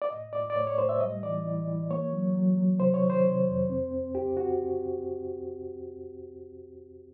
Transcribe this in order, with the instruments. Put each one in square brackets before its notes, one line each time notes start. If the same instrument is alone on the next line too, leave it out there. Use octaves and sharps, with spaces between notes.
[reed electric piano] D5
A2 D#5
A2 D5
D5
A2 C#5
C#5
A2 C5
E5
G3 D#5
E3 D5
E3
E3
A#3 C#5
F#3
F#3
F#3
C3 C5
C#5
D#3
C5
C3
F2
C4
C4
C#2 G4
F#4